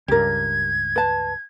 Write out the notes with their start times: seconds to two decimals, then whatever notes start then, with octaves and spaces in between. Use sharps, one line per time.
0.08 C#2 G2 G4 A#4 G#6
0.96 B4 A5